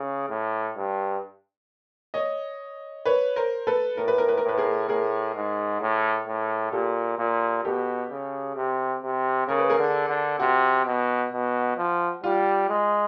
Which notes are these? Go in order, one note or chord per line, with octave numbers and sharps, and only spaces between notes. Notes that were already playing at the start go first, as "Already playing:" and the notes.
Already playing: C#3
A2
G2
C#5 D#5
B4 C#5
A#4 C5
A4 B4
A2 A#4
B4
A#4
B4
A#4
A2
B4
G#4 A#4
A2 G#4 A#4
G#2
A2
A2
A#2 G4 A4
A#2
B2 G4 A4
C#3
C3
C3
C#3 A#4
B4
G#4 A#4
D3
D3
C3 F#4
B2
B2
F3
G3 F4
G#3